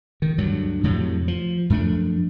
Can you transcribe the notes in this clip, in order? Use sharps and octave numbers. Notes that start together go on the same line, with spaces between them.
D#3
D2 G2 F#3
F2 A2 C3 F#3
F3
F#2 F3 A3 D4